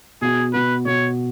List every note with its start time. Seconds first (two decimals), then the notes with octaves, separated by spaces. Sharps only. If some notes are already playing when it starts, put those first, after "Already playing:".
0.22 B2 B3 F#4 G#4
0.53 B2 B3 F#4 B4
0.85 B2 B3 F#4 C#5